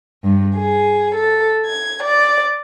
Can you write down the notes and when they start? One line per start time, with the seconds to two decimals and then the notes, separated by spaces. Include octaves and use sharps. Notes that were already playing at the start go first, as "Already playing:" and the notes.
0.24 G2
0.56 G#4
1.14 A4
1.65 G#6
2.03 D5